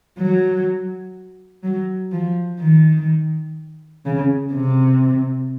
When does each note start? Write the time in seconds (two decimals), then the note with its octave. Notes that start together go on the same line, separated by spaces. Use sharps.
0.18 F#3
1.63 F#3
2.12 F3
2.59 D#3
4.05 C#3
4.53 C3